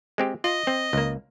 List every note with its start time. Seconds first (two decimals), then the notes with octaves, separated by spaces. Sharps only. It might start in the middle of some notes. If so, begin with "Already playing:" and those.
0.18 G#3 C4 G4
0.44 F4 D#5
0.67 C4
0.93 C#2 A#3